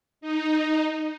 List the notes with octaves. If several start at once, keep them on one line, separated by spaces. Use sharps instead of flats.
D#4